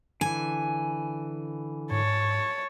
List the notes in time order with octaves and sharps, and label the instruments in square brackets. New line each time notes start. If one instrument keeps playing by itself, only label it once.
[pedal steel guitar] D3 E3 [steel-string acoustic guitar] G#5
[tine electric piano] G#2 [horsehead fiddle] C#5 A5